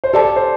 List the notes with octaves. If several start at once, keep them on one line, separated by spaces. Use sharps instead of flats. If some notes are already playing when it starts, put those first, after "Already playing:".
C5
G4 A4 D5 A5
A4
C5